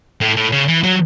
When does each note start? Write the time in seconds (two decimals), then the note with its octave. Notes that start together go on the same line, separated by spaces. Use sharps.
0.21 A2
0.37 A2
0.52 C#3
0.68 E3
0.83 F#3